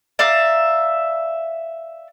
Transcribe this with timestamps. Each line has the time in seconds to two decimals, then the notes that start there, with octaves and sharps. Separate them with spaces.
0.19 D5 E5 F5 A#5